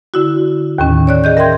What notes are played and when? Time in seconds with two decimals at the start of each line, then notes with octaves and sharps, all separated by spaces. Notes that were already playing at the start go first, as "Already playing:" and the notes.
0.14 D3 E4 F#4
0.78 D#2 A2 D#3 C#4
1.07 C#5 D5 F#6
1.24 G#4 D#5 G6
1.37 A#4 E5 G5 C6 G#6